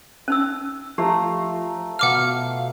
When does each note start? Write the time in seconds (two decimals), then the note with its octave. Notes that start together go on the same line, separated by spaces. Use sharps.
0.28 C#4 D#4 E6
0.98 F3 A3 F4 G4 A#5
1.99 B2 F5 F#5 D6 F6